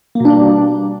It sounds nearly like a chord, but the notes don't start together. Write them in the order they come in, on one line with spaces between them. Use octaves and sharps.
A#3 B2 D4 G3